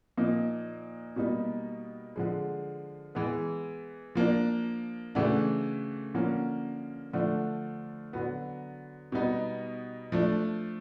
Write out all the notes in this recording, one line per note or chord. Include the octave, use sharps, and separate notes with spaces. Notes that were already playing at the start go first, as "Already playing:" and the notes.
A#2 F3 A#3 D#4
B2 G3 A#3 D#4
D3 F3 G#3
E3 G#3 B3
F3 A#3 D4
C#3 E3 A3 D4 F#4
D3 F3 A#3 C#4
D3 F3 A3 D4
D3 F#3 B3
B2 G3 B3 D#4
F3 A3 D4